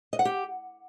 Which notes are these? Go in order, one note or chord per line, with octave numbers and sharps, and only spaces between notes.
D#5
F#5
G4